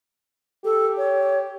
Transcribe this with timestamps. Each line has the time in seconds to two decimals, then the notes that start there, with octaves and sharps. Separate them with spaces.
0.65 G4 A4
0.97 C#5